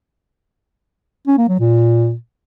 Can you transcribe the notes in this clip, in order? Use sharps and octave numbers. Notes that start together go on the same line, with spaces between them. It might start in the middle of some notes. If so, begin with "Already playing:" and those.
C#4
A#3
F#3
A#2